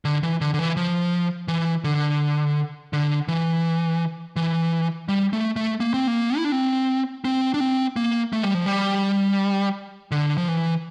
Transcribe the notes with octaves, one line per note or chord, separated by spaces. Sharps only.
D3
E3
D3
D3
E3
F3
E3
D3
D3
E3
E3
G3
A3
A3
A#3
C4
A#3
E4
D4
C4
C4
D4
C4
A#3
A3
G3
F3
G3
D3
F3
E3